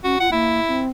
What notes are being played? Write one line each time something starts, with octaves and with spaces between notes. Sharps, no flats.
C#4 F#4
F4 F#5
A#3 E4
C4